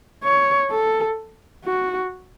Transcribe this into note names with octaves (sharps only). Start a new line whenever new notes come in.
C#5
A4
F#4